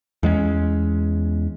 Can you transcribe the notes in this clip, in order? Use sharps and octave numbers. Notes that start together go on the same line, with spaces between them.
E2 G#3 B3 C#4